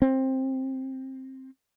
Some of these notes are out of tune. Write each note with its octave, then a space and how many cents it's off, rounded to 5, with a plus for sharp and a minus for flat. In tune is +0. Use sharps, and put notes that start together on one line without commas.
C4 +15